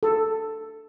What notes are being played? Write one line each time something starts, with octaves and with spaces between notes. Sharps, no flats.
A4